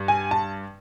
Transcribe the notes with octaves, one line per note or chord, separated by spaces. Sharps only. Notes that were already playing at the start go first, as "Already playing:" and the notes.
Already playing: G2
G#5
A5